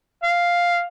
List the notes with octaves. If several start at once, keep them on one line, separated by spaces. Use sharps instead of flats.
F5